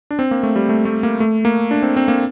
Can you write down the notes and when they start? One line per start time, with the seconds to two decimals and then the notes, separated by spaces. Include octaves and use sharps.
0.11 D4
0.19 C4
0.31 A#3
0.43 A3
0.56 G3
0.69 A3
0.85 A3
1.03 A#3
1.20 A3
1.45 A#3
1.71 D4
1.83 C4
1.96 C4
2.08 A#3